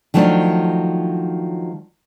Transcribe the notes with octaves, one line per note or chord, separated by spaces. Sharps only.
D#3 F3 F#3 A3 D4